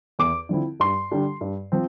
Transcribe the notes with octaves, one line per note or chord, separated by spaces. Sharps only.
E2 D6
D3 F3 C4 E4
G2 C6
D3 G3 D4
G2
F3 C4